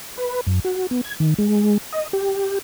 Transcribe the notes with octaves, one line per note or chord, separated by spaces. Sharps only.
B4
F#2
F#4
B3
G#6
D#3
G#3
D#5
G4